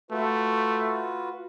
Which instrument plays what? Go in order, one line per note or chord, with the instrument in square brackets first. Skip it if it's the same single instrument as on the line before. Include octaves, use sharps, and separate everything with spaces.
[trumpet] A3 [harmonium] F4 F#4 B4